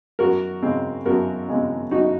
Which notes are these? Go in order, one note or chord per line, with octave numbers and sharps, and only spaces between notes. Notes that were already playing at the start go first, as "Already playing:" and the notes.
F#2 F#4 A#4
C#3 G#3 C4
F#2 F#4 A#4
C#3 G#3 C4
F#2 D#4 F#4